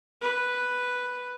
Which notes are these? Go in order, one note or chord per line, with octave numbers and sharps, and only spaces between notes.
B4